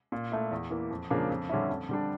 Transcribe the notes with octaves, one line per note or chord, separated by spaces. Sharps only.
A#2
A3 E4
E2
E3 A#3
F2
C#3 F3 A#3 D4
F2
D3 G3 C#4 E4
F2
D3 G3 D4